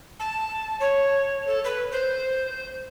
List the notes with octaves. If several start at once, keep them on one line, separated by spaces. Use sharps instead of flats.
A5
C#5
A4
B4
C5